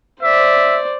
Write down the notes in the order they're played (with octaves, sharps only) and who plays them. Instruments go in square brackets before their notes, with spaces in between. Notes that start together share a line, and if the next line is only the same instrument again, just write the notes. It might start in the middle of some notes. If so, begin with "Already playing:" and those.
[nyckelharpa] C5 D5 [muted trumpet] E5